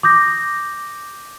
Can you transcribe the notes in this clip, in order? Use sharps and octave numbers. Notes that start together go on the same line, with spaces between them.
D6 D#6 G6 A#6